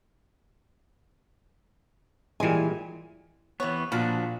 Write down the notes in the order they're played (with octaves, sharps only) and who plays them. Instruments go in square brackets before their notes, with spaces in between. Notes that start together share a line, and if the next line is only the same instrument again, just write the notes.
[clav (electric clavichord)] A#2 G3 G#3 [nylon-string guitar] E3 G#5
[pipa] C3 C#5 [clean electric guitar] E3 B3
[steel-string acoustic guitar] A#2 [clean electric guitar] F3 D4 F#4 [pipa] F4 B5